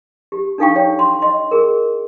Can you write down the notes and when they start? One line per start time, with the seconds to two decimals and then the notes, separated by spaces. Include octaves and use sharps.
0.32 G4
0.58 D4 D#4 A4 F5 G5 C#6
0.76 C#5
0.99 C6
1.22 D#5 C6
1.51 G#4 A#4